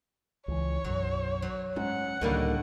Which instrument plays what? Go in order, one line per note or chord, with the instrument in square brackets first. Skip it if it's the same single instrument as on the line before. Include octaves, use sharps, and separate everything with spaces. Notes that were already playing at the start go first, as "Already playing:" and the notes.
[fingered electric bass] C#2 E3 [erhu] C#5
[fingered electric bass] B1 F#2 [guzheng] F#3
[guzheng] F#3
[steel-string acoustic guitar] G#2 [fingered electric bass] C#4 [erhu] F#5
[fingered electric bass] C#2 [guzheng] A2 D3 D#3 [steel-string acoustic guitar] G3 A#3 D#4